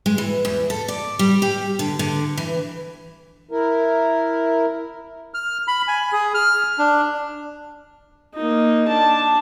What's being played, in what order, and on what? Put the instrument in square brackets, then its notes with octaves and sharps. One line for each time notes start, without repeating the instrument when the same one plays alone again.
[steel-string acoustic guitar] G#3
E3
E2
A4
D5
G3
G4
D3
D3
E3
[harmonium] E4 A#4
[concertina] F6
B5
G#5
G#4
F6
D4
[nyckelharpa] A#3 D#4
D4 A5